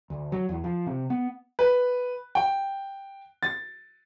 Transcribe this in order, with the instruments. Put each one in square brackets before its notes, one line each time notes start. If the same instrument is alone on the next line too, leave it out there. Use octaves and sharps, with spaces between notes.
[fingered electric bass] D2
F#3
E2
F3
C3
B3
[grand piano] B4
G5
A6